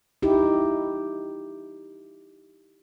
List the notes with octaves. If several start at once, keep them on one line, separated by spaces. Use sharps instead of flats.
D#4 E4 G4